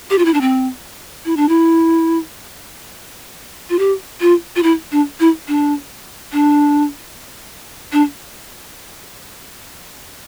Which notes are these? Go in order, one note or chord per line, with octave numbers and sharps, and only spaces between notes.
G4
F4
E4
D4
C4
E4
D4
E4
F4
G4
F4
F4
E4
D4
E4
D4
D4
D4